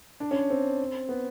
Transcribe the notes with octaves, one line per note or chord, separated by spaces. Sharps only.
D4
C#4
C4
B3